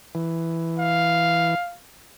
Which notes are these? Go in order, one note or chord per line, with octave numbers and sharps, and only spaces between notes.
E3
F5